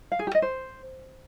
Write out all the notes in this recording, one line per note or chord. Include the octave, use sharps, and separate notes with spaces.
F5
G#4
G4
D#5
C5